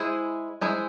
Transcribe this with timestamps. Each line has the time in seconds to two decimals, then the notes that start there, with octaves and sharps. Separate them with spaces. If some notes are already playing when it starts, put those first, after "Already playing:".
Already playing: G#3 E4 G#4 C5
0.61 G#3 E4 G#4 C5